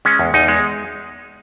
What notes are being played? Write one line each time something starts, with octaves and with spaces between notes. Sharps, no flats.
G#3 C#4
E2
E2 D#4
G#3